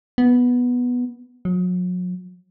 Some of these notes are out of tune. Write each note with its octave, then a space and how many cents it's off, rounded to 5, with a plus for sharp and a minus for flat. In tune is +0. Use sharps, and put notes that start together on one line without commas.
B3 -5
F#3 -40